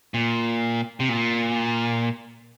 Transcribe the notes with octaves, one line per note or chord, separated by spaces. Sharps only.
A#2
C3
A#2